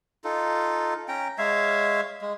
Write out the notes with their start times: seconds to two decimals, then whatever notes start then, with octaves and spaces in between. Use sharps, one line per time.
0.24 D#4 F4 A4
1.08 C#4 G5 A#5
1.38 G#3 C#5 E5 F5
2.21 G#3